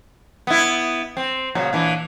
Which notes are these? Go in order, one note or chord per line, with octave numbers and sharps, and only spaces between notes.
B3 E4
C4
A#2 C#3 F#3
A#2 E3 D4